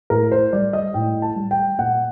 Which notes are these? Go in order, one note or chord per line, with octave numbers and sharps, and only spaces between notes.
A2 A#4
C5
G3 D5
D#5
A2 G5
A5
G3
G5
A#2 F#5